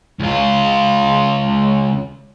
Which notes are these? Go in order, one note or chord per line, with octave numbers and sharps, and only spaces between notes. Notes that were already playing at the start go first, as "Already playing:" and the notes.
C#2 F4